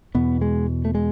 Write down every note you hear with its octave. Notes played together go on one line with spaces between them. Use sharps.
E2 B2 B3
G#3
A3
G#3